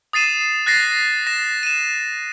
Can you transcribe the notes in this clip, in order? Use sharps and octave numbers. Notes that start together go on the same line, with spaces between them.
D#6 A6 C7 D#7 E7
F#6 A6 A#6 C7
A#6 E7
D#7 E7